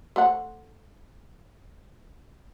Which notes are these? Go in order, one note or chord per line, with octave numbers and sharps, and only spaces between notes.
A3 C5 F#5